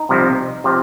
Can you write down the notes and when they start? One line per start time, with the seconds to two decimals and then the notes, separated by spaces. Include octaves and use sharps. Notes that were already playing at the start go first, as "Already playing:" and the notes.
Already playing: D#4
0.09 C2 C3 F3 C4
0.64 C3 F3 C4